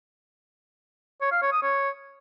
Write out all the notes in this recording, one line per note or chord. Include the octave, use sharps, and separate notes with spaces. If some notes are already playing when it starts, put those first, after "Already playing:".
C#5
F5
C#5
D#6
C#5